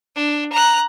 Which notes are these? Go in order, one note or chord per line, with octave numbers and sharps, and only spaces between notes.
D4
A#5 F#6